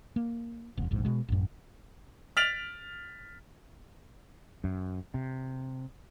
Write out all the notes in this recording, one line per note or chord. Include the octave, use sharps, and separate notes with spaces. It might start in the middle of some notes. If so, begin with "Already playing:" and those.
A#3
E1
F1 A#1 G#2
B2 G#3
A1 F#2
F6 A6 B6 D7 F7 F#7
F#2
C3